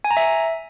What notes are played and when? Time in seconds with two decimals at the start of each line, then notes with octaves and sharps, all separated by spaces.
0.05 G#5
0.11 A#5
0.17 E5